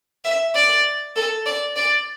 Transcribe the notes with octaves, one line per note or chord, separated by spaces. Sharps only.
E5
D5
A4
D5
D5